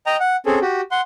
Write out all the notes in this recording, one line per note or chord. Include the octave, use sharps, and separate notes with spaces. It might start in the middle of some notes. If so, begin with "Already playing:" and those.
D#5 G5 A#5
F#5
C4 C#4 G#4 A4
F#4 G4
F#5 C6